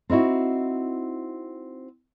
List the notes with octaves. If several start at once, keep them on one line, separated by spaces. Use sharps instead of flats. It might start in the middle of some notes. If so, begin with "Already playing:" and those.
C4 D#4 E4 F#4